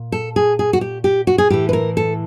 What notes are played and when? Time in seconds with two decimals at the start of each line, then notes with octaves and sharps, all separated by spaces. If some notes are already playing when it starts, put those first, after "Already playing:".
Already playing: A#2
0.12 A4
0.36 G#4
0.59 G#4
0.73 F#4
0.81 G4
1.04 G4
1.27 F#4
1.38 G#4
1.50 A2 E3 G4
1.69 B4
1.73 A#4
1.97 A4